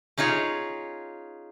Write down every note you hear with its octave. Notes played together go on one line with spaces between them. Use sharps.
C#4 D#4 F4 G#4 C#5